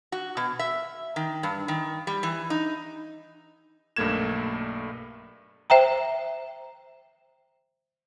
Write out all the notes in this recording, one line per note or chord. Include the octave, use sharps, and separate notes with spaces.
F#4
B2
E5
D#3
G2
D#3
G3
E3
D#4
B1 G2 A3 A#3 G#6 E7
C5 E5 G5 A#5